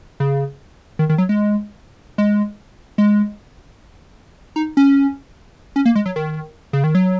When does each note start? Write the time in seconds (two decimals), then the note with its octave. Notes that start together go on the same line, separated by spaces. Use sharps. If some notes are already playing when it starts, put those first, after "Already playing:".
0.20 C#3
0.99 D#3
1.09 D#3
1.18 F#3
1.29 G#3
2.18 G#3
2.98 G#3
4.56 D#4
4.77 C#4
5.76 C#4
5.85 A#3
5.95 G#3
6.06 F#3
6.16 D#3
6.73 C#3
6.84 D#3
6.95 F#3